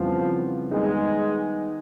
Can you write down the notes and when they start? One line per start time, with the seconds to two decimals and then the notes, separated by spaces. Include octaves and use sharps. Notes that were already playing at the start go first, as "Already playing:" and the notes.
Already playing: F2 C#3 E3 F3 G3 B3
0.71 D#3 G3 G#3 B3 D#4